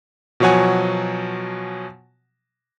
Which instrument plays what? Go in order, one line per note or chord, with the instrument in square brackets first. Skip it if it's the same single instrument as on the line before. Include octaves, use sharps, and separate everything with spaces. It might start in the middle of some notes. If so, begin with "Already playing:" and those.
[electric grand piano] B2 F3 F#3 C#5 F#5 G#5